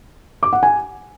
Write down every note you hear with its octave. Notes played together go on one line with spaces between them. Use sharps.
D6
F#5
G#5